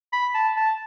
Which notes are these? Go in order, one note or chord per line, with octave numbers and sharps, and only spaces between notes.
B5
A5
A5